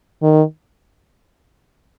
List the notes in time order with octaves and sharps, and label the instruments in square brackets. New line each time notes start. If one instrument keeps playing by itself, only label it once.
[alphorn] D#3